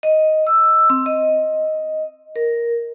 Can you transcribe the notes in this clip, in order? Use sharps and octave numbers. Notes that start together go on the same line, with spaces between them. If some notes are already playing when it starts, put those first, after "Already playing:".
D#5
E6
C4
D#5
A#4